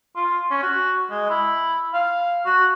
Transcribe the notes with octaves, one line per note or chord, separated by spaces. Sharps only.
F4
C#4
F#4
G#3
E4
F5
F#4